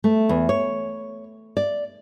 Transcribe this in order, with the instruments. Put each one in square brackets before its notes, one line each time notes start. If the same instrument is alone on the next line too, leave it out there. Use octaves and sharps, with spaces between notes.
[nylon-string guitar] A3
E2
C#5
D5